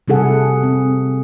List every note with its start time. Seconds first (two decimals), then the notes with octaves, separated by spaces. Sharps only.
0.08 C3 G3 E4 G#4 A4 F#5
0.63 C4